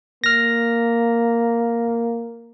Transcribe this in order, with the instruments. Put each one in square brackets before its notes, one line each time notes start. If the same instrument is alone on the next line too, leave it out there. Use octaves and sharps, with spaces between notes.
[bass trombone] A#3 [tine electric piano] F6 A#6